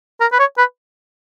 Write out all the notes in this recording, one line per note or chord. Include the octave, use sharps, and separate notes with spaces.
A#4
B4
C#5
B4